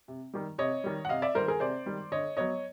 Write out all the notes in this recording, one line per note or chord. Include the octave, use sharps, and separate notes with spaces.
C3
D#3 G3
C3 C#5 D#5
D#3 G3
F#5
C3 D#5 F5
D5 E5
D#3 G3 A#4 C5
G#4 A#4
C3 C5 D5
D#3 G3
D3 C#5 D#5
F#3 B3 C#5 D#5